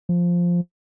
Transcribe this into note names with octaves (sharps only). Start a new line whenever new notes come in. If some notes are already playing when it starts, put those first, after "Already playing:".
F3